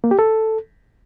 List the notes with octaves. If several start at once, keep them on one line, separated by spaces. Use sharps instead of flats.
A#3
G4
A4